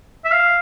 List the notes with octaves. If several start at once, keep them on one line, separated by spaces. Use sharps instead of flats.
E5
F5